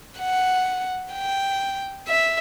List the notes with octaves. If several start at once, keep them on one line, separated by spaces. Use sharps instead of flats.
F#5
G5
E5